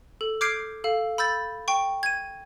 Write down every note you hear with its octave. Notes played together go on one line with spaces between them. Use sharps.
A4
D6 F6 G6 G#6 C7 D7
A4 F5
B5 E6 G6 A6
G5 C#6
G#6 D#7